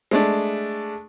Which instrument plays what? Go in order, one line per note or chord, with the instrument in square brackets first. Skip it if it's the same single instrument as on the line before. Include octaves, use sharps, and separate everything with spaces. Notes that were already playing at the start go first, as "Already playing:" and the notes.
[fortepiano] G#3 A3 D4